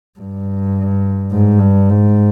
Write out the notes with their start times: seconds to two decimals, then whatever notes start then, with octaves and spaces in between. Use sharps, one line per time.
0.19 G2
1.32 G#2
1.59 G2
1.89 G#2